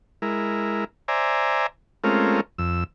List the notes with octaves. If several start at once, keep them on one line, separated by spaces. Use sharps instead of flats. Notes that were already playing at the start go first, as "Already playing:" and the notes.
G#3 E4 A#4
C5 D5 E5 G#5 A#5
G#3 A3 C4 C#4 F4 A#4
F2 E6